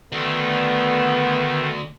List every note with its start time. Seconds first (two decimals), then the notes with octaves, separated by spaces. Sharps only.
0.12 D2 D3 D#3 A3 B3